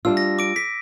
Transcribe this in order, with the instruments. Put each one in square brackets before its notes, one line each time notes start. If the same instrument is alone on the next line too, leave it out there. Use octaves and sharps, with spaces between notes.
[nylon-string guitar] G3 D4 F4 [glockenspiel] E6
[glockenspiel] A#6
D6 D7
B6